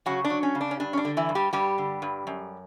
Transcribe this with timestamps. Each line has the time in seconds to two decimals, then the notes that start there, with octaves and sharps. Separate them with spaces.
0.06 C#3 F#3 F#4
0.25 D4
0.30 F#3
0.43 C#4
0.55 C#3
0.61 D4
0.71 C#4
0.80 G2 D4
0.93 C#4
0.97 D4
1.05 D3
1.17 E3 E4
1.29 G2
1.35 G3 G4
1.53 G2 G3 G4
1.78 D3
2.02 G2
2.27 F#2